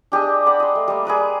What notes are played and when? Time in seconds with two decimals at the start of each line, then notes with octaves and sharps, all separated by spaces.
0.12 D4 G4 G#4 D#5
0.46 D5 F#5 B5
0.60 D#5 C6
0.75 A3
0.88 G3 A#3
1.05 G#4 A#4 B4 D5